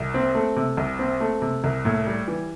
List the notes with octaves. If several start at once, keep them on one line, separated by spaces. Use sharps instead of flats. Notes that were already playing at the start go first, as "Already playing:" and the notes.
Already playing: C2
C4
A3
C3
C2
C4
A3
C3
C2
A2
G3
E3